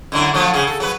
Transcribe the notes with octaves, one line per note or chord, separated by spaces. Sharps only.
F#2 D3 E4
F3 F#3 A3
C#3 G#4
A4
F#3 B4